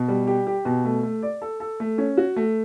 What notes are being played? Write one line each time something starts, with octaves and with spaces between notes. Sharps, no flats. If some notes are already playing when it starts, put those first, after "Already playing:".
Already playing: B2
G3
G4
G4
B2
A3
A3
D5
A4
A4
A3
C#4
F#4
A3